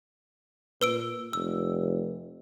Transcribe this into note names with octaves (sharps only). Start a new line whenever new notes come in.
A#2 B4 E6 D7
F1 E6